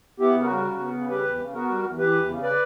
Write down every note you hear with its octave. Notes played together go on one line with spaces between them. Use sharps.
B3 E4 G4
C#3
F#4 A#4
G3
C#3
B3
C#3
G3 G4 B4
E2
C#3
B3 F#4 A#4
G3
E2
E3 G4 B4
E2
C#3
B4 D5